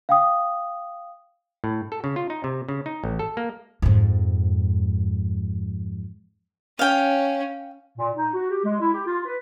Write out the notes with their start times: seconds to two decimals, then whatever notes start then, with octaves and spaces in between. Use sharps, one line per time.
0.09 F5 G5 D#6
1.64 A2
1.92 A4
2.04 C#3
2.16 F4
2.30 D#4
2.44 C3
2.69 C#3
2.86 D#4
3.04 A1
3.19 A4
3.37 A#3
3.82 F2 G#2
6.79 C#4 F5 G5
7.98 A#2
8.16 D#4
8.34 F#4
8.51 G4
8.65 G#3
8.81 E4
8.94 G4
9.07 F4
9.26 B4